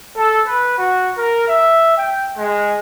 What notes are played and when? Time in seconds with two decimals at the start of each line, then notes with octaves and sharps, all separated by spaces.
0.16 A4
0.47 B4
0.78 F#4
1.17 A#4
1.48 E5
1.97 G5
2.37 G#3